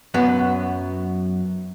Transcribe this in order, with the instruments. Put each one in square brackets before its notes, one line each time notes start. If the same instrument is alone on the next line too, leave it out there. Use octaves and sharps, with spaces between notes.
[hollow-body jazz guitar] F#2 F#3 B3